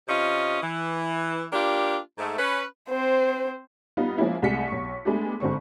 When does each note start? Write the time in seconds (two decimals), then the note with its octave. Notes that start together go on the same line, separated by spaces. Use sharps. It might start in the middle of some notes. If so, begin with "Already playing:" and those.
0.08 C3 C#4 F4 D#5
0.62 E3
1.52 A#3 D4 F4 G4
2.18 G#2 A3
2.39 C#4 B4
2.89 C4 C5
3.97 G3 B3 D#4 F4
4.18 F3 G#3 A#3 C#4 E4
4.42 C2 G#3 A3 B6 C#7
4.68 B1 C#6
5.05 G#3 A3 B3 D4 G4
5.40 G1 G#2 D3 C4 C#6